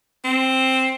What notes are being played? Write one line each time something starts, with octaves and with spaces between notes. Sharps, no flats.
C4